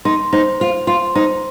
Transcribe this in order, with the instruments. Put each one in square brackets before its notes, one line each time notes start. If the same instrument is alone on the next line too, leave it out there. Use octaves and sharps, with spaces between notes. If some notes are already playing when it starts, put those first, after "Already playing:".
[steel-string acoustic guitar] D#4 [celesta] C6
[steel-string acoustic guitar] D#4 [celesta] C5
[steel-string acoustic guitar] F4 [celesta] C5
[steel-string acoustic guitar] F4 [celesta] C6
[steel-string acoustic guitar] D#4 [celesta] C5